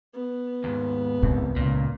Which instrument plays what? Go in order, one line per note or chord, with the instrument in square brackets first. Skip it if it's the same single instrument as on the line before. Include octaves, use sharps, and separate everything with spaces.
[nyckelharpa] B3
[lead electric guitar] D#2 G#2
[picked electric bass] C#2 C3 C4 [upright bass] A2
[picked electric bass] C#2 C#3 [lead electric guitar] A#2